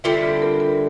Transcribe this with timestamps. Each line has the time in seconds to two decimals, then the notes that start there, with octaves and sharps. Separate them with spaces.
0.04 D3 G3 C4 E4 F4
0.23 F4
0.42 A#4
0.60 A#4